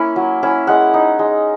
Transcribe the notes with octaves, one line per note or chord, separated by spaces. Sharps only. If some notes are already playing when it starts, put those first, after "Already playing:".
Already playing: A#3 C#4 E4
F#3
C#4 E4
G#3 F#5
D#4
G#3